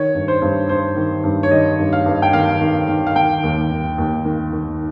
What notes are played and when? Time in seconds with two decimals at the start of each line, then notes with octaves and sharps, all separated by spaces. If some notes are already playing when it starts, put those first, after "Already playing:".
Already playing: D#3 C#5
0.15 G2
0.28 C5
0.42 G2
0.69 G2 C5
0.97 D#3
1.24 G2
1.43 C#5
1.51 D#3 D#5
1.79 G2
1.93 F5
2.06 G2
2.22 G5
2.33 D#3 F5
2.61 D#3
2.88 D#3
3.07 F5
3.15 D#3 G5
3.43 D#2
3.71 D#3
3.98 D#2
4.25 D#3
4.52 D#3